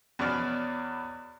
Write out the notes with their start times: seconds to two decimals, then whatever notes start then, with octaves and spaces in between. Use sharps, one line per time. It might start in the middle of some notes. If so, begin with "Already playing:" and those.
0.19 E2 B2 C#4 C#5 D5 F6